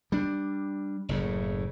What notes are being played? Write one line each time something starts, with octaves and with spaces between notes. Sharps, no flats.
G3 D4
F#1 A2 C#3